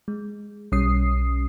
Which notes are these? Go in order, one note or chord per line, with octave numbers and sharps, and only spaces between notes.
G#3
B1 G3 C#4 D#6 C7